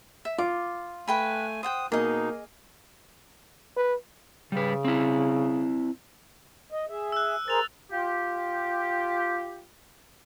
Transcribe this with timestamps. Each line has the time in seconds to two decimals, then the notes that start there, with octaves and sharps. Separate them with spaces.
0.25 E5
0.38 F4 D6
1.08 A3 B4 G5 G#5 B5
1.63 C5 F#5 G5 D#6
1.92 B2 A#3 D#4 G#4 D#5
3.76 B4
4.52 C#3 G3 B4
4.85 C4 E4
6.72 D#5
6.89 G#4 E5
7.12 E6 F#6
7.48 G#4 A#4 C5 A6 F7
7.91 F4 G4